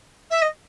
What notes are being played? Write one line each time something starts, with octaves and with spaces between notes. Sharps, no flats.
E5
D#5